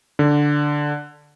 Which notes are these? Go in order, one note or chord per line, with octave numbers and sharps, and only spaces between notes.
D3